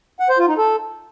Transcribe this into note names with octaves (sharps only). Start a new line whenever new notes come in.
F#5
C5
F4
D#4
A4